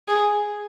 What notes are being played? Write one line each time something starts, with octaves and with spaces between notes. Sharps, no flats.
G#4